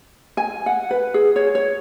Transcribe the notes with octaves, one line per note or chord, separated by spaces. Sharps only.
G#5
F#5
B4
G#4
C#5
C#5